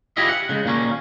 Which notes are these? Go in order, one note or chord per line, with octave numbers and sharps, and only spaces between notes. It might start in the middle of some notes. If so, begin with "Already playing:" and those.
E4 F4 G4 G#4 D#5 E5
F#5
C#3 G#3
A#2 D#3 A#3 C#4